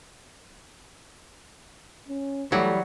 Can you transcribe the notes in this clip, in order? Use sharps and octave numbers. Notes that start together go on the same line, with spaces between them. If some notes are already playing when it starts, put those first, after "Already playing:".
C#4
E3 F#3 G3 A3 D5